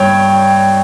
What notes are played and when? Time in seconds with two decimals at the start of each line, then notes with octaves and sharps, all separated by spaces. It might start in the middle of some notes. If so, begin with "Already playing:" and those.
Already playing: G2 C#5 G5